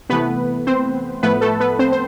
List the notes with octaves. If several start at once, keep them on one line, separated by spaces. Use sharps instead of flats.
C3 E3 A3 B3 B4
C4 C5
A2 F3 A3 B3 B4
A3 A4
B3 B4
C4 C5
C5